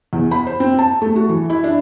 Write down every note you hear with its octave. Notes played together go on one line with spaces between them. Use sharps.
E2
B5
C5
C4
A5
A3
F#4
E3
E4
D4